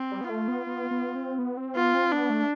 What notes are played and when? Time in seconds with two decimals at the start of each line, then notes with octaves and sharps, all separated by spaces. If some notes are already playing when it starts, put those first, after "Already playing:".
Already playing: C4
0.11 G3
0.21 B3
0.30 A3 F4
0.48 B3
0.67 B3
0.91 B3
1.15 C4
1.39 B3
1.57 C4
1.76 B3 F4
1.94 C4
2.12 B3 D4
2.30 A3